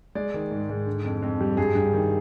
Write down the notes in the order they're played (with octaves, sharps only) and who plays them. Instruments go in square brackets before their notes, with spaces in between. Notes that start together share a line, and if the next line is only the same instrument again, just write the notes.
[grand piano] G#3 D5
D#3
G#2
G#2
D3
F2
F2
G3
G2 G#4
G2
D#3